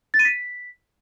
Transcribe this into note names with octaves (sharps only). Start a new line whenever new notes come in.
A6
D#7
B6